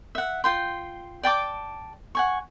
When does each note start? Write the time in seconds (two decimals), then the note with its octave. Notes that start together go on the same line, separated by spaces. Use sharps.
0.15 E5 F#5
0.44 F4 G5 C6
1.23 D5 G5 A5 D6
2.15 F#5 G#5 C#6